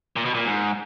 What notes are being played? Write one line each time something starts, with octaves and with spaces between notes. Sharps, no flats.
A#2
B2
A#2
G#2